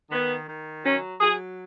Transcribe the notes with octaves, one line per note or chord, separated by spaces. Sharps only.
D#3 B3
D#3
F#3 C#4
F#3 G#4